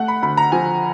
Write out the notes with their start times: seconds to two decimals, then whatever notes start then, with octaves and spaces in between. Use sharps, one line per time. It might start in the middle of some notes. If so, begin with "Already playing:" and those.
Already playing: A3 F#5
0.08 B5
0.22 D2 B5
0.37 A#5
0.52 F3 G#5